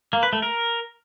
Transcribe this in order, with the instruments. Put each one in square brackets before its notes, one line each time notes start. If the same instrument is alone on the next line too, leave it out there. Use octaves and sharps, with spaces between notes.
[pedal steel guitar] A#3
B4
A3
A#4